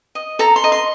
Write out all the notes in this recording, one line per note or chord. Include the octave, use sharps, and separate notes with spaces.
D#5
A4 A#5
C6
D#5
C6